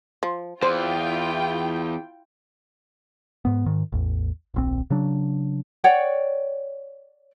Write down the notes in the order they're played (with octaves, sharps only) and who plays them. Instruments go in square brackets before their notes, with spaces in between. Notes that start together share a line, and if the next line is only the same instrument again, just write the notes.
[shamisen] F3
[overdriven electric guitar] E2 [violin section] E4 F4 G5 [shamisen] C5
[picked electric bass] G#2 B3
G#2 D#3
A1 E2
D1 A#1 C4
C#3 F#3 D4
[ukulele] C#5 D5 F#5 G5